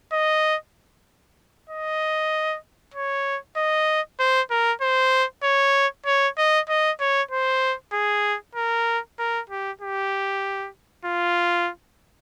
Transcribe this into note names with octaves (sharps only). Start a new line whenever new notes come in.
D#5
D#5
C#5
D#5
C5
A#4
C5
C#5
C#5
D#5
D#5
C#5
C5
G#4
A#4
A#4
G4
G4
F4